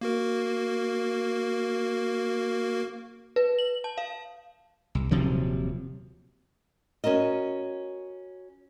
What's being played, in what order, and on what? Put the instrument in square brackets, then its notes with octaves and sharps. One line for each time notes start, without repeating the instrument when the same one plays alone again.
[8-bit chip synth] A#3 F#4 A#4
[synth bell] B4
F#7
A5
F5
[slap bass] C2
D#1 C3 F3 F#3
[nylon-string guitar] C#4 F#4 A#4 D#5